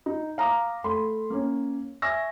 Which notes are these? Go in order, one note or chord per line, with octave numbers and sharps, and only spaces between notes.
D#4
F5 A#5 D6 D#6
A3 B5 C6
A#3 C#4
E5 G#5 C#6 E6 A#6